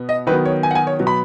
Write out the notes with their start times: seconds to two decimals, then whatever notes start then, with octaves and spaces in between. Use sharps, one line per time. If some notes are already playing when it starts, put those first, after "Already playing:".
Already playing: B2 B3
0.09 D#5
0.27 D#3 F#3 B3 B4
0.46 C#5
0.63 G#5
0.71 F#5
0.75 G#5
0.87 C#5
0.99 B2 F#3 B3
1.07 B5